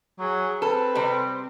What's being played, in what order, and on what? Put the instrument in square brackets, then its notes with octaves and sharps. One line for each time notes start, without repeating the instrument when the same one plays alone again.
[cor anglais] F#3 [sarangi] G#4
[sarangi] C4 [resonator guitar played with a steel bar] A4 [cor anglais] B4
[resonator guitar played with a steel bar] C3 G3